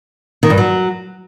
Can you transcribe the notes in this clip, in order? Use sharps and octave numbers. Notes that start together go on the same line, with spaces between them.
D#3
G2
F#3